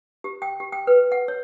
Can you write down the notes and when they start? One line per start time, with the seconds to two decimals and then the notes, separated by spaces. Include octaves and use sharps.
0.24 G4
0.42 G5
0.60 G4
0.72 G5
0.87 B4
1.12 F#5
1.28 C#5